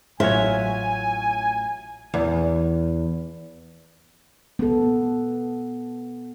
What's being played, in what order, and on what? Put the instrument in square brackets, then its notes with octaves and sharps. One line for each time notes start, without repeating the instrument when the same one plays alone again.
[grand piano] A1 F#3 F6 [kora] F4 F#4 C#5 [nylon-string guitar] E5 [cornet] G#5
[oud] E2
[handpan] B3 A4